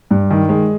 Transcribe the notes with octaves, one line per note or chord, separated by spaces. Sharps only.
G2
D#3
G#3